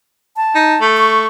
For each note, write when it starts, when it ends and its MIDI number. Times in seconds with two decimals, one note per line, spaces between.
0.37 0.87 81
0.55 0.76 63
0.81 1.27 57
0.97 1.27 85